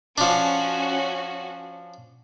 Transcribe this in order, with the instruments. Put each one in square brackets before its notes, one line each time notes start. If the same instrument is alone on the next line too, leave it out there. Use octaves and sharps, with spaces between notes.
[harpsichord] F3 D4 [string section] C#4 F#4